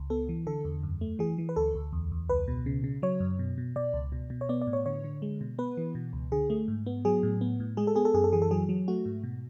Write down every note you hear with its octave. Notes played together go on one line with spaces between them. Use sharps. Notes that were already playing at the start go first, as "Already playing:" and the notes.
Already playing: C#2
B3 A4
E3
D3 A4
E2
F#2
A3
E3 G#4
E3
B4
D2 A4
D2
E2
E2
C#2 B4
B2
C#3
C#3
F#3 C#5
F#2
B2
B2
B2 D5
C#2
B2
B2
C#5
B3 D5
D5
A2
C#5
D3 C#5
D3
G#3
B2
B3 B4
E3
B2
C#2
D3 G#4
A3
G#2
B3
F#3 G#4
A2
B3
A2
G#3 G#4
A4
B3 G#4
A4
F#2 G#4
A4
E3 G#4
A4
F#3 G#4
F#3
A3 F#4
G#2
B2